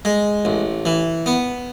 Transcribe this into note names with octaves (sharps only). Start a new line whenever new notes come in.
G#3
A1
E3
B3